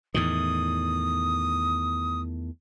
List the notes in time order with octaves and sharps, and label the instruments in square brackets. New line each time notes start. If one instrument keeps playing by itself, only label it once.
[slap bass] E2 A2 D#3 [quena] D#6